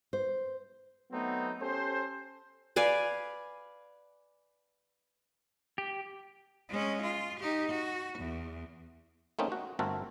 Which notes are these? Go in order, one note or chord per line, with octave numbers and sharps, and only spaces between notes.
C5
F#3 A3 B3 C4 D#4
C#4 G4 A4 C5
B4 D5 F5 G#5
G4
G#3 C#4
F4
D#4 G4
F#4
E2
A3 A#3 C4 C#4 D#4
F#4
G1 A3 C4 F#4 A4 A#4